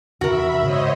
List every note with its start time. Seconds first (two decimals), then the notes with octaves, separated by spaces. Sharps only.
0.21 E2 C3 D#3 F#4 A#4 E5 B5
0.63 G#2 C#3 C5 C#5 D#5